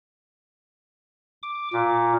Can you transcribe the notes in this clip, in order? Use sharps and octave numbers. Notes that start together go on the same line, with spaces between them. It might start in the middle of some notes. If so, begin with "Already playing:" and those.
D6
A#2